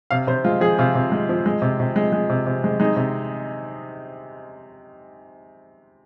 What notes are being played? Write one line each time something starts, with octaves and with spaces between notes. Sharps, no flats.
C3 F5
C3 C5
G#3 F4
F3 G#4
C3 F4
C3
G#3
F3
G#3
C3
C3
G#3
G#3
C3
C3
G#3
G#3 D#4
C3